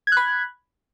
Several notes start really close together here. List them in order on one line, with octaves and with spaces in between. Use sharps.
G#6 F#6 B5